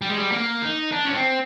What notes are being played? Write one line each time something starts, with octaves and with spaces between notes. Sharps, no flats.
G3
G#3
G3
A#3
D#4
D4
C#4
C4